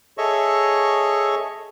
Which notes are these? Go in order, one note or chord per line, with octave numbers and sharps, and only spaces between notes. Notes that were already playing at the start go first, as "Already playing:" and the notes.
G#4 A4 C#5 D#5 E5 C#6